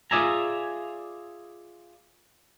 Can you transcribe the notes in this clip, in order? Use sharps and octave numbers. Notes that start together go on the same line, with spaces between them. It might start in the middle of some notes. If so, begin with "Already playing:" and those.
F4 G#4 D5 E5 G#5 A#5